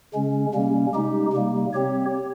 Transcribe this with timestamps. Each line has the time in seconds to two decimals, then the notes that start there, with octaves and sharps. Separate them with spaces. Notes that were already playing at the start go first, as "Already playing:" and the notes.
0.14 C#3 G#3 C#4
0.54 C3 G3 A#3 C#4
0.94 G#3 D#4 G4
1.33 C3 G3 A#3
1.73 C4 G4 C#5